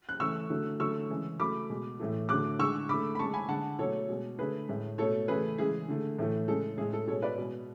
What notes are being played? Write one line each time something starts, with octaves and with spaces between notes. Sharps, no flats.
F#6
C#3 E3 A3 C#6 E6
D3 F#3 A3
D3 F#3 A3 C#6 E6
C#3 E3 G#3
C#3 F#3 A3 B5 D6
B2 G#3
A2 E3 A3
D3 F#3 A3 D6 F#6
D3 G#3 C#6 E6
D3 A3 B5 D6
B5
C#3 G#3 A5 C#6
G#5 B5
D3 G#3 F#5 A5
B2 F#3 A3 A4 C#5
B2 G#3
D3 A3 G#4 B4
A2 G#3
B2 A3 A4 C#5
C#3 E3 A3 G#4 B4
C#3 E3 G#3 G#4
D3 A3
A2 E3 A3
C#3 G#3 A4
A2 G#3 G#4
A4
B2 G#3 A4 C#5
B4 D5
B2 G#3